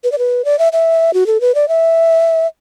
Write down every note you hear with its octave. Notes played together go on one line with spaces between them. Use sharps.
B4
D5
B4
D5
E5
E5
F#4
A4
B4
D5
E5